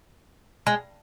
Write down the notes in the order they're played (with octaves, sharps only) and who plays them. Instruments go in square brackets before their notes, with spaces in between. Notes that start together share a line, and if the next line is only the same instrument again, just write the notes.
[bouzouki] G#3